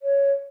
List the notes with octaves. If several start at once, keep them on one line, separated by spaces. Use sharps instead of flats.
C#5